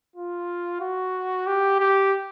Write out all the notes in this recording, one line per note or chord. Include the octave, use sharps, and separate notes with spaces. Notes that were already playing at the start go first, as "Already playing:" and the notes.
F4
F#4
G4
G4